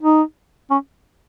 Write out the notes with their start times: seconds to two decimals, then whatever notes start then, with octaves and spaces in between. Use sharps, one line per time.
0.01 D#4
0.70 C#4